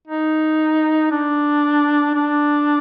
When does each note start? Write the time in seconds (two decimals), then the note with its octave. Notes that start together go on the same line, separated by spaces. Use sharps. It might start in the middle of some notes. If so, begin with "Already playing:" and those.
0.07 D#4
1.11 D4
2.15 D4